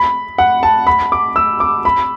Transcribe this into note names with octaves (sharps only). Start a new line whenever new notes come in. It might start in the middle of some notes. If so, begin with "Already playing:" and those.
Already playing: B5
F#5
A5
B5
D6
E6
D6
B5